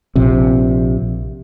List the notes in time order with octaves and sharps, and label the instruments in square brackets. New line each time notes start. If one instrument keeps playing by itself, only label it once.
[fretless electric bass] A#1 C3